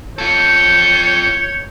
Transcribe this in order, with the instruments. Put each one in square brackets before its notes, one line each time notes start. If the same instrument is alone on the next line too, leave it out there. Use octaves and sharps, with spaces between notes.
[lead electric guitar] F4 A4 [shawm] C#5 [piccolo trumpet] G6